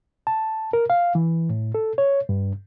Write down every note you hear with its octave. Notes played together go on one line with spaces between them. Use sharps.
A5
A#4
F5
E3
A2
A4
C#5
G2